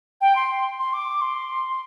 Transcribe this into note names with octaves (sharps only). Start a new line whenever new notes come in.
G5
C6
C6
D6
C6